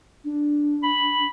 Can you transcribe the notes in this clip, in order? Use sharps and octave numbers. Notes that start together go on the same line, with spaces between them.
D4
B5